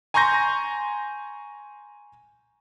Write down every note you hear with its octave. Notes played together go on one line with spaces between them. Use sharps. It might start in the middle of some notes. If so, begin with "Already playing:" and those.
G#5 A#5 C6 C#6 G6 A#6